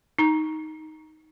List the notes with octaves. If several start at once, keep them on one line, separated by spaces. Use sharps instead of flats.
D#4 A#5